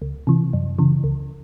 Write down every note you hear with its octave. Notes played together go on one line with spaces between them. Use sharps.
C#2
C3 E3
F#2
C#3 E3
C#2